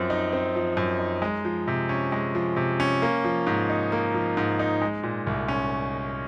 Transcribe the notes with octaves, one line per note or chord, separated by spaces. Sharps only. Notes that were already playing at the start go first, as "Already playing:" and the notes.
Already playing: F#2 F3 C4
D#4
C4
F3
F#2
D#4
G#3
F3
C3
C#4
G#3
F3
C3
C#4
A#3
F3
G#2
D#4
A#3
F3
G#2
D#4
G#3
A#2
C2
C#4